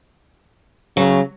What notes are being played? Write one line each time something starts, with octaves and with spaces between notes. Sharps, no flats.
C#3 F#3